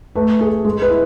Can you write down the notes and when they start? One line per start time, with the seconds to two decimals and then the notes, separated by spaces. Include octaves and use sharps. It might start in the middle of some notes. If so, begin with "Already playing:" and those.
0.15 A3 B4
0.41 G#4 A4
0.65 G#3
0.82 B4
0.90 E4